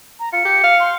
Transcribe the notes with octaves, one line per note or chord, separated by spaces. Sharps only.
A#5
F4 C#7
G4
F5
C6